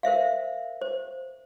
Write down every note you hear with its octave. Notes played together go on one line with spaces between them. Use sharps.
A#4 C5 E5 F5
C5